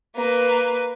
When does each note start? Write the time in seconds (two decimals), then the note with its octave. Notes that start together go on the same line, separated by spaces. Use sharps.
0.16 A#3 B4